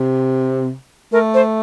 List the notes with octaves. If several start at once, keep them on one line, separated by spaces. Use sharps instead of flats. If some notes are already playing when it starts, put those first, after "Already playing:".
Already playing: C3
A3 A#4
C5